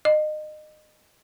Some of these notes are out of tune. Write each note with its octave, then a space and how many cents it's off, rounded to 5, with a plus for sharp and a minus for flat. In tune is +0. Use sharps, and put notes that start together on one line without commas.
D#5 -30